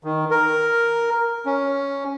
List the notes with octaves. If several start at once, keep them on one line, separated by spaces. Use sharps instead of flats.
D#3
A#4
C#4